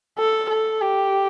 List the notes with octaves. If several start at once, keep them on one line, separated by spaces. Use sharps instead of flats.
A4
A4
G4